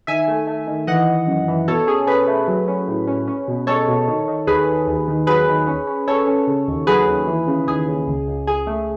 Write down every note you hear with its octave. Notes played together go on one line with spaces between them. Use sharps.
D#3 E5 G#5
A3
A3
D#3
E3 D#5 F#5
E3
F#2
E3
B2 A4 C#5
C#4 G#4
C#4 G#4 B4
A3
F#3
C#4
A2
C#4
C#4
B2
G#3 A4 C#5
B2
D#3
D#3
D#2 G#4 B4
D#2
D#2
D#3
F#3 G#4 B4
D#3
C#4
C#4
C#4 A4 C#5
C#4
C#3
D#2
F#3 G#4 B4
D#2
E3
C#3
D#2 G#4
C#3
C#2
C#2
C#2 G#4
A3